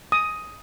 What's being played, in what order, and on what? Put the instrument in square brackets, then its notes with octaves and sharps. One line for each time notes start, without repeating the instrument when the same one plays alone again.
[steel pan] D#6